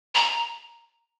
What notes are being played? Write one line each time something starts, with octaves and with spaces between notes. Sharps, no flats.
A#5